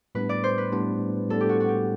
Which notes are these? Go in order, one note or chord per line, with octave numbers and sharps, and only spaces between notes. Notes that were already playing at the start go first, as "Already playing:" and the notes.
A2 G3 B3 D4 B4
D5
C5
B4
A2 G3 B3 D4
A2 G3 B3 D4 A4
G4
F#4
F#4
G4